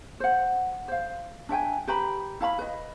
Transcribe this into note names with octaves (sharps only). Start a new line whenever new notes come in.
C5 F#5
C5 F5
D4 E5 G5 G#5
G4 B4 A#5 B5
E4 F5 A#5 B5
B4 D#5